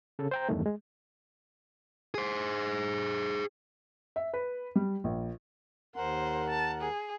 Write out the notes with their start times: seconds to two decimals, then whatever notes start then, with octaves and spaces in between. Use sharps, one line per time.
0.19 C#3 A4
0.31 C5 G5 A#5
0.49 E2 G2 D#3 A3
0.66 G#3
2.14 G#4 C5
4.16 E5
4.33 B4
4.75 G3
5.04 A#1
5.96 D#2 A#4 C5 F#5
6.49 A5
6.81 G#4